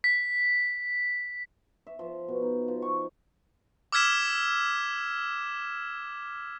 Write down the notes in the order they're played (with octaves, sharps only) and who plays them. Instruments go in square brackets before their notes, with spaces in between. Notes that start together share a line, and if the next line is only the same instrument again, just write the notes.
[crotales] B6
[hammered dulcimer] E5
F3
B2
D#4
F3
C#6
[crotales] D6 E6 F6 G#6 B6 E7